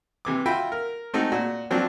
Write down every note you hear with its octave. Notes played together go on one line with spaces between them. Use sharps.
C3 E3 D6
F4 F#4 E5 G5 B5
A#4
G#3 A3 C4 D#4 F#4
A#2 F#4
F3 F#3 C4 D4